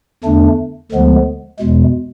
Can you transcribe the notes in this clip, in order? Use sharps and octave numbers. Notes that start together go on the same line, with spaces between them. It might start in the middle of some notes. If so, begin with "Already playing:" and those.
E2 D3 A3 D4
D2 D3 F3 G#3 B3
E2 B2 G#3